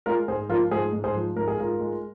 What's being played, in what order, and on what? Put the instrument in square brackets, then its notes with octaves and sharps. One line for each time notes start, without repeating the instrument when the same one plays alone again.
[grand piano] G#3 F4 A#4
G#2 G#4 C5
F3 F4 A#4
G#2 G#4 C5
G#2
G#4 C5
F3
G#2 A#4
G#4
G#2 F4 A#4
G#3